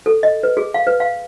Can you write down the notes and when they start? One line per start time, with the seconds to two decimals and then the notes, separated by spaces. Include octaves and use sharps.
0.06 A4
0.23 D#5
0.43 B4
0.57 G#4
0.74 F5
0.87 B4
1.00 F5